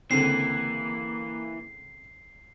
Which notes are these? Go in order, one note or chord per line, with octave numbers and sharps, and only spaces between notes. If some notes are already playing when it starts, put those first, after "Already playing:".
C#2 D3 E3 A#3 C4 C7